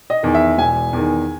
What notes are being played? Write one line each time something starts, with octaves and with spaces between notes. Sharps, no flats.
D#5
E2 D#3
E5
E1 G#5
E2 D#3